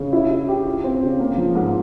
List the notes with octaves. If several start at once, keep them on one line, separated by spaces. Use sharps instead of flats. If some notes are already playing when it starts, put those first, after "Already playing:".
Already playing: C#3
E4
E4
G4
F4
C4
C#3
A#3
F3
G#2